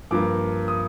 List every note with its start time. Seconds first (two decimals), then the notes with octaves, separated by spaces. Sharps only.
0.11 G2 F3 A#3 D6
0.68 D#6